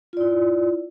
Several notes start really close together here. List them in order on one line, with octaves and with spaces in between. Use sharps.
F4 D5 E4